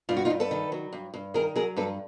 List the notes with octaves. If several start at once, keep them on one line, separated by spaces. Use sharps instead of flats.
G2 F4
F#4
D#4 F4
G2
A4 B4
D#3
F#3
G2
G2
D#3 G#4 A#4
F#3 G#4 A#4
G2 A4 B4